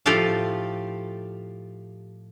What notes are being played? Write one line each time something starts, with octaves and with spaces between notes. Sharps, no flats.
A2 F3 F4 G4 A4 F5